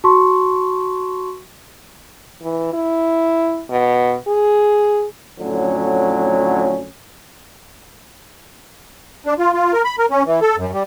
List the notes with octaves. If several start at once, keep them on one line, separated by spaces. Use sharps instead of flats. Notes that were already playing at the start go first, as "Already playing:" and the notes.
F#4 A5 C6 C#6
E3
E4
B2
G#4
F2 A2 D3 F#3 C#4
D4
F4
F4
A#4
B5
A#4
C#4
E3
A4
F#2
G3